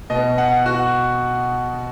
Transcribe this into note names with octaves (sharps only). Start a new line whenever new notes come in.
B2 B3 D#5
F#5
F#4